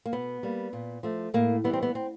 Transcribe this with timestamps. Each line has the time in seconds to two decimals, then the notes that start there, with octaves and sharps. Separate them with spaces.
0.06 A#3
0.12 B2 B3
0.43 G3 A#3
0.73 A#2
1.03 F3 A3
1.34 A2 A#3
1.64 E3 G3 B3
1.73 C4
1.83 B3
1.95 C4